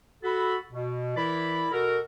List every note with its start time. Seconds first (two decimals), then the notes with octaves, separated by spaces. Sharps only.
0.23 F#4 A4 B5
0.72 B2
1.16 E3 E4 A#4 D5 B5
1.71 B2 F#4 A4 A#4